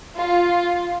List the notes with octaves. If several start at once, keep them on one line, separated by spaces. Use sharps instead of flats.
F4